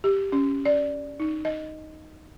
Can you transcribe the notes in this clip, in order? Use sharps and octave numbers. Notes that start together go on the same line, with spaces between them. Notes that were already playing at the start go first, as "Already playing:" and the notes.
G4
C#4
D5
D#4
D#5